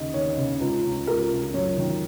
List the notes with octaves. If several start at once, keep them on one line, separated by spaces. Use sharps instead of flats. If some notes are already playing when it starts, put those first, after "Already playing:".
Already playing: D#2 C#3 D#5
D#2 C#5
C#3
C#2
C#3
C#2 A#4
C#3
F#2 C#5
D#3